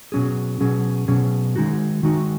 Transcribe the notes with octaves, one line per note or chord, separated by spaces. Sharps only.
B2 F#3 C#4 G#4
B2 F#3 C#4 G#4
B2 F#3 C#4 G#4
D#3 G#3 D#4 F#4
D#3 G#3 D#4 F#4